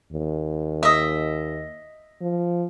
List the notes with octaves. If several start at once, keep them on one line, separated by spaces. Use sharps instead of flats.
D#2
D#5 E5
F3